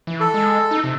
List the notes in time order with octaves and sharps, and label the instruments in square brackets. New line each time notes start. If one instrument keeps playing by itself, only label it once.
[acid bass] E3
[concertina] A4
[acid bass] G#3
D#4
C3